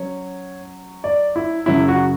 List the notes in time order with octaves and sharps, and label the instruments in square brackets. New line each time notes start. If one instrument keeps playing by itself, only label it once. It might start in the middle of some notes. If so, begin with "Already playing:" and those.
Already playing: [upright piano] F#3 C#4 C#5
D5
E4
F#2 C#3 F#3 E4
F#4